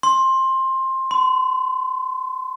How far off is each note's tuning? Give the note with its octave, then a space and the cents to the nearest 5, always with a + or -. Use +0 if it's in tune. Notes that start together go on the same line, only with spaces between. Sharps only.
C6 +15
C6 -40